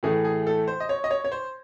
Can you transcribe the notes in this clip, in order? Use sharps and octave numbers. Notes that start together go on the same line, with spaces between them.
A2 E3 A3 G#4
G#4
A4
C5
D#5
C#5
D#5
C#5
C#5
C5